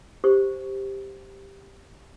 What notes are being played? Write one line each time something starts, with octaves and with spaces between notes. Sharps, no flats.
G4 C5 C#6